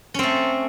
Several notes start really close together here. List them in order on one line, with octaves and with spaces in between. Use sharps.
C#4 C4 A3